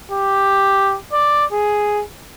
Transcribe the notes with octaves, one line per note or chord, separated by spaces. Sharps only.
G4
D5
G#4